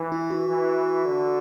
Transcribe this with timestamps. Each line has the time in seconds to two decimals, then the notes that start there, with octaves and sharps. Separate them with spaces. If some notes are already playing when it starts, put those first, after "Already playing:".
Already playing: E3
0.12 E4
0.30 F#4
0.49 E3
1.05 D3